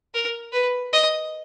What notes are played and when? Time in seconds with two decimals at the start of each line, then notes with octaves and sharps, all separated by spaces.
0.14 A#4
0.53 B4
0.93 D#5